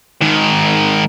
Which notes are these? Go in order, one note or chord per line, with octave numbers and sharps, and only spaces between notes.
G#2 D#3